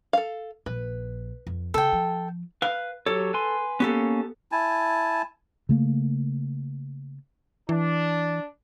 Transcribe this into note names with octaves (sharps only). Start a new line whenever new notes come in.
A4 F5
A#1 B4
F2
C#3 A4 G5
F3
B4 F5
F#3 G4 A4 C#5
B4 G#5 C6
A#3 B3 C#4 G4 A4
E4 G#5 A5
C#3 A3 A#3
E3 D4